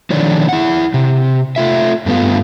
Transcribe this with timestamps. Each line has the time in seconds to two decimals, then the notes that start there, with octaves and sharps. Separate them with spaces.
0.10 D3 D#3 F3 C#5 D5
0.49 E4 F#5
0.94 C3
1.56 A3 F4 E5
2.06 G2 A3 B3 F4